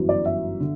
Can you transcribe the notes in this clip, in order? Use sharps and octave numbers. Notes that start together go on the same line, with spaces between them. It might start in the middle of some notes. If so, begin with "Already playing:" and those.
Already playing: G1 F#2 E3
D5
E5
D3